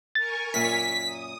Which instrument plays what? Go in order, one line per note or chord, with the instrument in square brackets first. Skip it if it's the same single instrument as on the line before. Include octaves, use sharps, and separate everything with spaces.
[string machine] A#4 G#5 C#6 [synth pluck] A6
[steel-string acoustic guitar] F#2 A#2 [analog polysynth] B6
[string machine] D#6